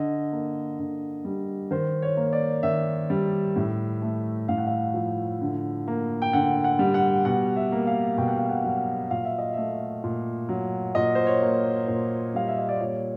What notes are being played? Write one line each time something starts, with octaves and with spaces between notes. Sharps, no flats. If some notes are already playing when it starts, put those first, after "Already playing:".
Already playing: D3 D#5
A#3
D3
G3
D#3 C5
C#5
A#3
D5
D#3 E5
G3
A2
A3
A2 F5
F#5
F5
F3
D3
A#3
G5
D3 F#5
F#5
G3
F#5
B2 F#5
E5
A#3
F5
B2 G5
F#5
F5
F#5
F#3 F5
A#2 F5
E5
D#5
A3 E5
A#2
F#3
A#2 D#5
C5
C#5
A#3
A#2 C5
G3 F5
E5
D#5
D5
A#2 C#5